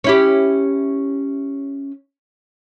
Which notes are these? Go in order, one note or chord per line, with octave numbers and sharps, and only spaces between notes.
C#4 E4 G4